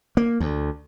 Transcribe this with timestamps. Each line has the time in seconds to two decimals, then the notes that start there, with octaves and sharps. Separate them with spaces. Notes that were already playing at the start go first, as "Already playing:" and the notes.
0.17 A#3
0.40 D2